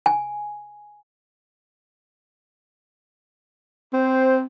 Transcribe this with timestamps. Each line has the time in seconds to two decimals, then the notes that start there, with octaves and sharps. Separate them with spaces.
0.06 G#5
3.93 C4 C5